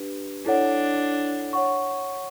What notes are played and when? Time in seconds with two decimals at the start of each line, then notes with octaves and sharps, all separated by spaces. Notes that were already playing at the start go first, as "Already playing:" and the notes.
Already playing: D4 G4 B4
0.46 D4 E4 A4 C#5 F#5
1.53 C#5 F#5 C#6